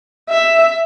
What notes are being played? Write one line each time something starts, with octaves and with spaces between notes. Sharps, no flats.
E5